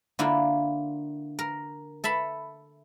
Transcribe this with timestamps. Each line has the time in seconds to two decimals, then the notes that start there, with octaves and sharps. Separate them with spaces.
0.19 D3 A#3 E4 F4
1.39 A#4
2.04 A4 E5 A5 B5